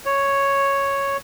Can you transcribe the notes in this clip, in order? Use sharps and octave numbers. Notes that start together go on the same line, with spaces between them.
C#5